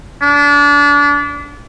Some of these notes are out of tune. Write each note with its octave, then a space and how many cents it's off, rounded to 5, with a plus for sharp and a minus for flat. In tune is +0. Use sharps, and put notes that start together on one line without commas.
D4 -30